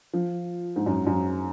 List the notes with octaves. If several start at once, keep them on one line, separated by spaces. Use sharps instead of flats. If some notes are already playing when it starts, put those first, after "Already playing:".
F3
G#2
F#2
F#2